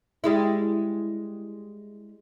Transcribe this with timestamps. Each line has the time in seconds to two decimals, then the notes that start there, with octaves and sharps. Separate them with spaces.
0.24 G3 G#3 E4